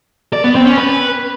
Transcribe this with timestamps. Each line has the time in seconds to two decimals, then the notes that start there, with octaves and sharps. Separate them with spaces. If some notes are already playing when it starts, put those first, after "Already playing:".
0.33 D5
0.44 B3
0.55 C4
0.66 C#4
0.77 B4